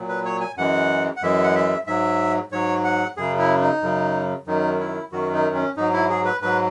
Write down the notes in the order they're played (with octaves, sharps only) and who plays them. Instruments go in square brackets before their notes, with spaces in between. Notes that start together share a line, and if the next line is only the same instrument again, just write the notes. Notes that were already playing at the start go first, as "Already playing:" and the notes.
Already playing: [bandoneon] A#2 F#3
B4
C#5
G#5
F#2 E3 G#3 F#5
F#5
F#2 E3 G#3 E5
F#5
E5
G#2 F#3 E5
G#2 F#3 C#5
F#5
F#2 C#3 F#3 G#4
E4
D#4
F#2 C#3 F#3
F#2 D#3 F#3 D#4
E4
F#2 D#3 F#3 F#4
D#4
C#4
G#2 F#3 D#4
E4
G#4
B4
G#2 F#3 B4